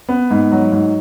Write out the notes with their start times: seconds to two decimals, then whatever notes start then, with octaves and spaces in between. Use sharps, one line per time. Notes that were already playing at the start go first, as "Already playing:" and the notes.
0.09 B3
0.30 G#2
0.52 F#3
0.72 G#2